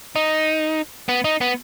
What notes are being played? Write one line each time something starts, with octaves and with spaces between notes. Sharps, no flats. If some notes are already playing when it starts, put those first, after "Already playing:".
D#4
B3
D#4
B3